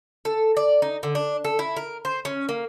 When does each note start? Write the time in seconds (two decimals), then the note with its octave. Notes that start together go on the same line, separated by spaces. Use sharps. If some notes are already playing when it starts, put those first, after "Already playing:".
0.25 A4
0.57 D5
0.82 D#4
1.03 D3
1.15 D4
1.44 A4
1.59 E4
1.76 A#4
2.05 C5
2.25 C#4
2.49 A#3